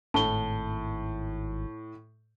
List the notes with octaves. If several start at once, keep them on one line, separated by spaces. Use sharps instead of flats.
G#1 A2 A5 G7